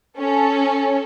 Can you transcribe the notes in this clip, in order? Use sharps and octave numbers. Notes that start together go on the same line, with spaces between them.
C#4 A4